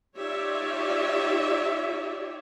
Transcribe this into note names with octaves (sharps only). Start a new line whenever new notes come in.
D#4 F4 G4 C#5 D5 E5